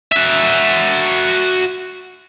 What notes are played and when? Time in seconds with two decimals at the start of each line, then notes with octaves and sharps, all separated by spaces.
0.12 F#4 E5